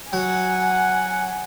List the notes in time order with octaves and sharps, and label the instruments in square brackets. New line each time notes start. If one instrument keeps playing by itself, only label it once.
[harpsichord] F#3 [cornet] F#5 [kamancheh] G#5